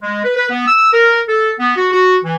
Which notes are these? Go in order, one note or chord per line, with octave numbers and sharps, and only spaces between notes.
G#3
B4
B4
B3
E6
A#4
A4
B3
F#4
F#4
E3